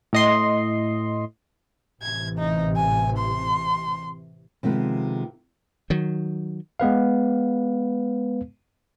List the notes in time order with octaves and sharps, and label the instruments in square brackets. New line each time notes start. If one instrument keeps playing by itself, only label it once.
[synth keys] A2 D#5 C6
[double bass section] A1 C3 E3 [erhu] G#6
[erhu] D#4
G#5
C6
[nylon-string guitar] C3 D#3 F3 G#3 B3
[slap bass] D#3 F#3
[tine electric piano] G#3 B3 B4 F5